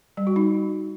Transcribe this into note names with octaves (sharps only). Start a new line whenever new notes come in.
G3
F#4
D#4